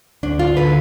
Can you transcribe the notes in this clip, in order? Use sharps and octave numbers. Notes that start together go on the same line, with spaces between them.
D2 D4
F4
D3 B4